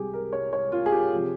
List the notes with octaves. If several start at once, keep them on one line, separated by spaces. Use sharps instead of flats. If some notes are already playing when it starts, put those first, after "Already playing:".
Already playing: C2 C3 G3 G4 G#4
A#4
C#5
C#5
F4
G#4
G4
C3 F3